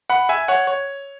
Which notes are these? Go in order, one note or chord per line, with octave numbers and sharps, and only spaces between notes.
F#5 B5
E5 G#5
C#5 F#5
C#5